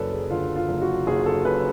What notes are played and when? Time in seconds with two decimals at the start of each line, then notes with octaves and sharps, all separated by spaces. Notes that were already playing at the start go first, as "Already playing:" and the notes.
Already playing: F#1 F#2 A4 B4 D5
0.12 G#4
0.30 D3 F4
0.56 F4
0.69 F#1
0.81 F#4
1.07 F#1 G#4
1.26 A4
1.45 F#2 B4